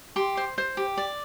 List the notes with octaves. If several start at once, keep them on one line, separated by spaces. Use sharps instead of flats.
G4 C6
C5
C5
G4
D5